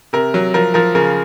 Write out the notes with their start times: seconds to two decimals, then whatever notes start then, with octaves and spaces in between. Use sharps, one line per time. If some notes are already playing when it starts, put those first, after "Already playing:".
0.13 C3 A#4
0.34 F#3
0.54 F3 A#4
0.74 F3 A#4
0.95 C#3 A#4